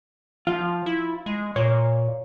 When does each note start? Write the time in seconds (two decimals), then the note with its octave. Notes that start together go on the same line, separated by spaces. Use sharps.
0.47 F3 F4
0.86 E4
1.26 G#3
1.56 A#2 C#5